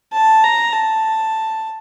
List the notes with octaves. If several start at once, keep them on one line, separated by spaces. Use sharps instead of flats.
A5
A#5
A5